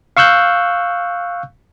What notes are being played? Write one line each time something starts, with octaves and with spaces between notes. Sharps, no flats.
F5 C#6 E6 F#6 G6